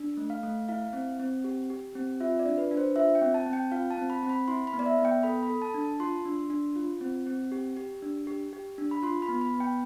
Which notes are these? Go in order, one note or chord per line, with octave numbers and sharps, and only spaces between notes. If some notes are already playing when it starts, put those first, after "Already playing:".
Already playing: D4
A3
F5
A3
E4 F5
C4
C4
G4
G4
C4
F4 E5
D5
D4
B4
D4
C5
F4 E5
G5
C4
A5
C4
G5
F4 F5
A5
C4
B5
C4
B5
E4 C6
B5
B3
D5
E5
B3
G5
A4 B5
B5
A4
A5
D4
A5
F4 C6
D4
D4
F4
C4
C4
G4
G4
D4
G4
G4
D4
B5
F4 C6
B5
B3
B5
B3
G5